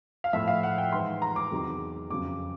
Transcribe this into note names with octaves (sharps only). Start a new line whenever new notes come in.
F5
A2 F3 E5
F5
F#5
G5
G#2 E3 C6
A#5
D6
E2 C3 D#3 F#3
F2 C#3 F#3 D6